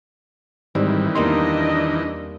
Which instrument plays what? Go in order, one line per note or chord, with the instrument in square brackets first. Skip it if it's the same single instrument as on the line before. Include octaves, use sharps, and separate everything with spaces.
[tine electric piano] G#2 G3 [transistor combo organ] D#3 E3 [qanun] C4
[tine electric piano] E2 C6 [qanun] G3 A#3 D#4 [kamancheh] D4 D#5